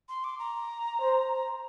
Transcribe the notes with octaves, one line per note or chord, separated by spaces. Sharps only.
C6
D6
A#5
C5